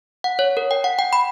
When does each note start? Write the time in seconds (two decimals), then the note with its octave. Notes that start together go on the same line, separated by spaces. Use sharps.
0.24 F#5
0.39 C#5
0.57 A#4
0.71 G5
0.84 F#5
0.99 G5
1.13 B5